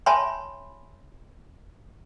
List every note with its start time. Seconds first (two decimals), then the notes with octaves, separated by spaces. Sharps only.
0.06 C#5 E5 G#5 A5 B5 C6